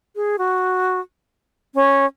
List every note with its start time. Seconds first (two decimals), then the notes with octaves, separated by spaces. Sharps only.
0.16 G#4
0.38 F#4
1.75 C#4